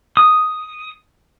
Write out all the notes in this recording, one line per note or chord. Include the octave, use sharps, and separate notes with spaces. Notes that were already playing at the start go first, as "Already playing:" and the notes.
D#6